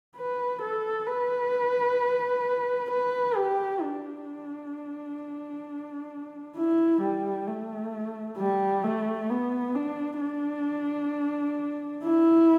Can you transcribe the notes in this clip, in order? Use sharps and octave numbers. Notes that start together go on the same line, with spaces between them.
B4
A4
B4
B4
G4
D4
E4
G3
A3
G3
A3
B3
D4
D4
E4